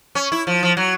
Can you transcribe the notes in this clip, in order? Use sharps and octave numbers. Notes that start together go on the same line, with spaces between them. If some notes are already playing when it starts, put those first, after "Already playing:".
C#4
E4
F3
F3
F#3